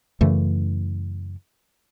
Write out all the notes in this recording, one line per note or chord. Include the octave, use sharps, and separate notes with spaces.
F#2 C#3 E3 A3